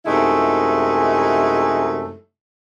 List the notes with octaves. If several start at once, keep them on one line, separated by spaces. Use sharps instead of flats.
F#2 C3 G#3 A3 D#4 E4